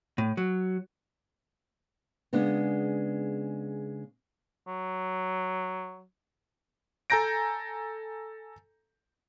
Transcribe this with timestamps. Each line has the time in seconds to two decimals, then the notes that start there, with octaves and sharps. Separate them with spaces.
0.18 A2
0.37 F#3
2.33 C#3 G#3 B3 D4
4.67 F#3
7.10 A4 G#5 A#5 G6 A#6 D7